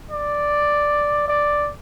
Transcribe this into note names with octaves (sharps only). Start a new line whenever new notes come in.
D5
D5